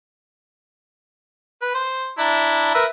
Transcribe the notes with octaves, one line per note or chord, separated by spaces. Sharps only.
B4
C5
D4 E4 A#5
A#4 B4 E5